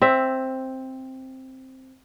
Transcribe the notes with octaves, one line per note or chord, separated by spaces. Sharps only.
C4 E5